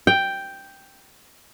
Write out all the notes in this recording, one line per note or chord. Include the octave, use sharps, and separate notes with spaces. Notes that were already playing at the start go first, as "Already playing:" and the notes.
G5